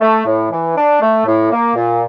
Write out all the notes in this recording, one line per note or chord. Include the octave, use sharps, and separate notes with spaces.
A3
A2
E3
D4
A3
A2
A#3
A#2